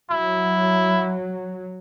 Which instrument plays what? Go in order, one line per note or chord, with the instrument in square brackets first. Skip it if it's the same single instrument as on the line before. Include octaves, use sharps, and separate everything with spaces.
[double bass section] F#3 [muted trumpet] E4